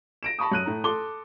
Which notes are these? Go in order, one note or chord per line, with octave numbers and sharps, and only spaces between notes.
A#6 D7 E7
A5 B5 C#6 D#6
F#2 F#6 D#7
A2 A3 A#5
A4 C6 D6 G7